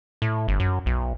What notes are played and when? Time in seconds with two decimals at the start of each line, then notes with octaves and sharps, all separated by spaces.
0.22 A2
0.48 G1
0.60 F#2
0.86 B1